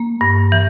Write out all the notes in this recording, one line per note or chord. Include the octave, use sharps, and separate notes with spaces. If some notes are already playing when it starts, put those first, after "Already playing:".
Already playing: A#3
G2
E3